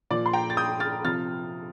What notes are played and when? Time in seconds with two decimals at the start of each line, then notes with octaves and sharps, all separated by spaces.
0.11 A#2 F3 D5
0.26 C6
0.33 G5 A#5
0.50 A6
0.57 D#6 G6
0.80 F6 A6
1.05 C3 F3 F6 A6